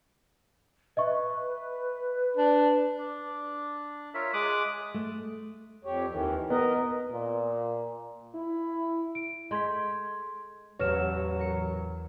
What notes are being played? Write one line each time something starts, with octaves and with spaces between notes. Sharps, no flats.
B4 D#5 E5 C#6
D4
D4
F4 A#4 C#5 E5
G#3 D6 D#6 F#6
A3
F2 G4 C#5
D#2 D#3 E3
B3 A#4 D#5
A#2
E4
D7
G#3 A4 C6 G6 G#6 B6
A1 E2 F#3 B4 C#5 F6 A#6 E7
A#4 C#7